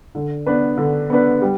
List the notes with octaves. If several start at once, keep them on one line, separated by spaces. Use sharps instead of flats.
D3
B3 D4 B4
D3
B3 D4 B4
G3